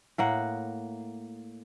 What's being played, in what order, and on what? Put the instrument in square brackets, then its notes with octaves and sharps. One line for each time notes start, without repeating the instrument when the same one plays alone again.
[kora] A2 A#3 F#5